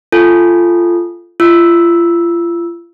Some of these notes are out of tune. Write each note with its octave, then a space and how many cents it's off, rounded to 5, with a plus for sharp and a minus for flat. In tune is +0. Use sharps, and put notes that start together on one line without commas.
F4 -15 A4 +0 G#5 +0
F4 -35 E6 -5